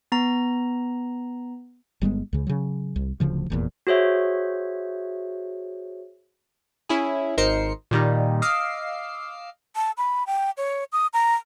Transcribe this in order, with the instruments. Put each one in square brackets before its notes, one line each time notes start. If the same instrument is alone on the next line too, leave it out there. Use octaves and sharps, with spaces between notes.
[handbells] B3 A#5
[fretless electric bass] G1 G3 G#3 B3
C#2 C#3
C#3 F#3
C2
D1 D2 C#3 F3
F1 E2 A#2
[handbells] F#4 G#4 C5 C#5 E5
[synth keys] C#4 E4 G#4
G#1 D#4 A#4 C5 C7 C#7
A#2 D#3 G3 D#4
D#5 F5 D6 E6 C7
[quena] A5
B5
G5
C#5
D#6
A#5